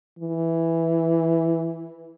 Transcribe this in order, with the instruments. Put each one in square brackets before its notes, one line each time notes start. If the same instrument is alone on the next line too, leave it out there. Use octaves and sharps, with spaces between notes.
[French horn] E3